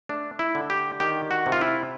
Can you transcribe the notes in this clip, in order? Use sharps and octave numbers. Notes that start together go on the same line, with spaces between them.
A3 D4
E4
D3
G4
D#3 G4
F#4
C3
F4
E4